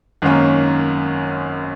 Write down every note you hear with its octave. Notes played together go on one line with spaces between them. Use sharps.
G#1 F#2 D#3 A#3 C#4